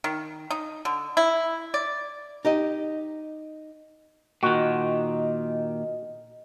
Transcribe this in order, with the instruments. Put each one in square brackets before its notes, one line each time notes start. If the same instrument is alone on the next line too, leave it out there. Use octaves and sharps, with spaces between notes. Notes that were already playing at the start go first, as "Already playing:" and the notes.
[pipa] D#3
D#4
D3
E4
D5
[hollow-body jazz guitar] D#4 G4 D#5
[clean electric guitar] A#2 D#3 [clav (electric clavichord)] F#4 [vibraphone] D#5